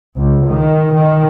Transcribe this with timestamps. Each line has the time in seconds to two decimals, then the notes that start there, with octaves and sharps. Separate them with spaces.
0.18 C#2
0.48 D#3
0.93 D#3